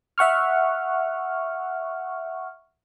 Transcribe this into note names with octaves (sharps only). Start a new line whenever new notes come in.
E5 F#5 C#6 F6